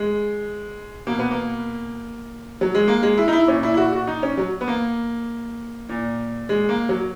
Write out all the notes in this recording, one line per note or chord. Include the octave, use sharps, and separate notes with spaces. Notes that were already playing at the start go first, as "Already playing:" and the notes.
Already playing: G#3
B2 A#3
B3
A#3
F#3
G#3
A#3
G#3
E4
D#4
E4
A#2 C#4
E4
E4
F#4
F#4
D#4
C#4
F#3
B3
A#3
A#2
G#3
A#3
F#3